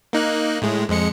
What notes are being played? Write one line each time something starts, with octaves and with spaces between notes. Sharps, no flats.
A#3 D#4 F#6
A2 G#3
F2 G#3 C#7